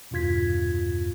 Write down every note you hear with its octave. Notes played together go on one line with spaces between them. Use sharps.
E2 G2 B2 F4 G#6 B6